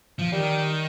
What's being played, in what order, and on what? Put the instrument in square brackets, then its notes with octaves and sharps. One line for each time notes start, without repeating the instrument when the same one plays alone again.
[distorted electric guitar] F3
[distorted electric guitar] D#3 [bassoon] G3